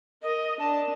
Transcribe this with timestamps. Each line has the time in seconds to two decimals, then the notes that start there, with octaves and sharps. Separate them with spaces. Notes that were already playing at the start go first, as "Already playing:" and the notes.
0.23 A#4 D#5
0.59 D4 A5